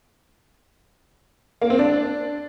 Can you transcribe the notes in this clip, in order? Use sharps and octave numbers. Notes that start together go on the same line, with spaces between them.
A#3
C4
D4